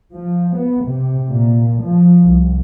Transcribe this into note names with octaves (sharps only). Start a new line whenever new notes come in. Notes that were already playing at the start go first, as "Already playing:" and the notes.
F3
B3
C3
A#2
F3
C2